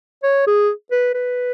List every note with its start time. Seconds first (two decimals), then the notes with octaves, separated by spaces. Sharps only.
0.23 C#5
0.47 G#4
0.92 B4
1.15 B4